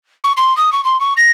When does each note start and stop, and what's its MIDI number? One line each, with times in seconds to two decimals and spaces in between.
0.24 0.32 85
0.37 0.55 84
0.57 0.72 87
0.72 0.83 85
0.84 0.99 84
1.00 1.13 85
1.17 1.31 94